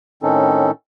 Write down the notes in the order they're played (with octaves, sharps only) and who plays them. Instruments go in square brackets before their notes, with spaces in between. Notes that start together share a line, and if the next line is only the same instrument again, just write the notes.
[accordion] A2 D#3 C4 C#4 D#4 A4